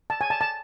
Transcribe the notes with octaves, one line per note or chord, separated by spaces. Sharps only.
A5
G#5
A5
A5